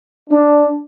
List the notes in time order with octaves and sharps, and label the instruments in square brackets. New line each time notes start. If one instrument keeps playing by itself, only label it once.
[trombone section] D4